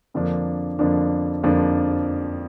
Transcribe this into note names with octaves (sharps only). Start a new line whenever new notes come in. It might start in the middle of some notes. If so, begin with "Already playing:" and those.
F2 D3 F3 A#3 D4
F2 D3 F3 A#3 D4
F2 D3 F3 A#3 D4